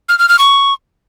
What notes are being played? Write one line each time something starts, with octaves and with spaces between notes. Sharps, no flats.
F6
F6
F6
C#6